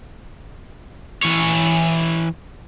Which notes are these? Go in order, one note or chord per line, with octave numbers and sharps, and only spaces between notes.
E3 C#5